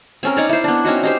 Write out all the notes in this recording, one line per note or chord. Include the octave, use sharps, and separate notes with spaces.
C4 C#4 A#4
D#4 C#5 D5
E4 C5
B3 D4
C4 C#4 D#4 F#4
D#4 G4 C5